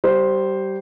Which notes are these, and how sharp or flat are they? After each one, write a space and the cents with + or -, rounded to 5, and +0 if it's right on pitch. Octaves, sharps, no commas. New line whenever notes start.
G3 -20 C5 +0